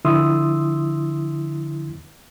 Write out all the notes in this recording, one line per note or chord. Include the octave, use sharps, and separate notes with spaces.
D3 F3 E4 C6 D#6 E6